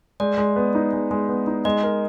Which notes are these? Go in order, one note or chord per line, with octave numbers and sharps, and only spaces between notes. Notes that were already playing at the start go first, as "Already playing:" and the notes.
G#3 D5
G#3
B3
D#4
G#3
G#3
B3
D#4
G#3 D#5
A#4